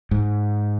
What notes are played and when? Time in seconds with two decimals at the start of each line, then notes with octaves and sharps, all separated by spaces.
0.11 G#2